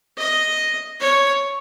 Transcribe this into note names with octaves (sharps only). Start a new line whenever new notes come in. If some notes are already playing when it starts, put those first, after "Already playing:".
D#5
C#5